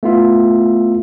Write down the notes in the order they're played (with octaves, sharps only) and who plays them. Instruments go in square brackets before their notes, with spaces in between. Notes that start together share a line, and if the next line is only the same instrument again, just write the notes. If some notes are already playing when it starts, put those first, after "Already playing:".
[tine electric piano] A3 B3 E4 F4 E5